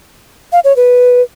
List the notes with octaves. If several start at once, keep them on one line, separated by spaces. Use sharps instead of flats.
F5
C#5
B4